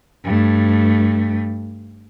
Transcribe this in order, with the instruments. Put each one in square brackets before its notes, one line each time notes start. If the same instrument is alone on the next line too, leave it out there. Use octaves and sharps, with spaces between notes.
[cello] G2 A3